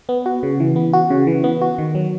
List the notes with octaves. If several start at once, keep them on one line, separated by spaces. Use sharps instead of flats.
B3
F#4
C#3
E3
B3
F#4
C#3
E3
B3
F#4
D#3
F#3